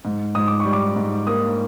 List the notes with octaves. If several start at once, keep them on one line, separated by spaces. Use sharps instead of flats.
G#2
G#2 D#6
D6
G3 C#6
D6
G#2
A#3 D#6